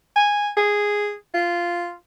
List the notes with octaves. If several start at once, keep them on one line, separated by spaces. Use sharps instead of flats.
G#5
G#4
F4